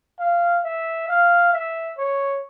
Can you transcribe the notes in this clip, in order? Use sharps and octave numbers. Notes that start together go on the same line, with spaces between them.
F5
E5
F5
E5
C#5